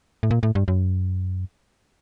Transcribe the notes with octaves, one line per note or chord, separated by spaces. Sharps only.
A2
A#2
A2
G2
F#2